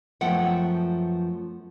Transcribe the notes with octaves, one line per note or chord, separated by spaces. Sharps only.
F#2 F3 A3 B3 F#5 G5